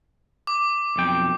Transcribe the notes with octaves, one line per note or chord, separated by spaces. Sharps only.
D6
B1 F2 G5